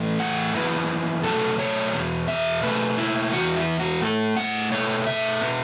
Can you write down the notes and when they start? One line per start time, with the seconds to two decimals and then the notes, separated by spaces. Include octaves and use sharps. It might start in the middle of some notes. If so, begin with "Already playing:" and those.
Already playing: A2 E3 A3
0.20 F#5
0.54 F#2 E3 B3
1.23 B2 F#3 A3 A4
1.59 C#5
1.93 E2 B2
2.28 E5
2.63 B2 A3 B4
2.98 E4
3.33 E2 E3 B3 F#4
3.56 E4
3.79 F#4
4.02 A2 A3 A4
4.37 F#5
4.71 B2 A3 C#5
5.07 E5
5.41 B2 B3